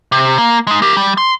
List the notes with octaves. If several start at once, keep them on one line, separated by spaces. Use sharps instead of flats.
C3
A#3
G#3 D#4
G4 A#4
G3
C6